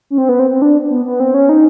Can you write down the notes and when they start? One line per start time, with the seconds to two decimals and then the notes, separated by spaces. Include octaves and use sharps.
0.10 C#4
0.18 C4
0.29 B3
0.39 C4
0.51 C4
0.62 D4
0.90 B3
1.05 B3
1.20 C4
1.34 C#4
1.49 D#4